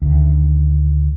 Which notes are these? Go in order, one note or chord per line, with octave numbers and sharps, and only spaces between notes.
D2 D#3